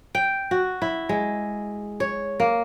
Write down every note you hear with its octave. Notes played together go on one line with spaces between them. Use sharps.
G5
F#4
E4
G#3
C#5
A#3